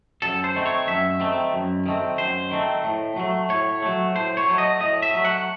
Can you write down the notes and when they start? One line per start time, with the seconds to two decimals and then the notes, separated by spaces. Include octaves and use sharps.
0.22 F#2 A4
0.44 C5
0.55 D#3 A3 C4
0.66 C#5
0.87 F#2 E5
1.20 D#3 A3 C4
1.53 F#2
1.86 D#3 A3 C4
2.18 F#2 C5
2.51 D#3 A3 C4
2.84 A2
3.16 F#3 A3
3.49 A2 C#5
3.82 F#3 A3
4.15 A2 C5
4.37 C#5
4.48 F#3 A3
4.58 D#5
4.80 A2 D#5
5.02 E5
5.14 F#3 A3
5.25 F#5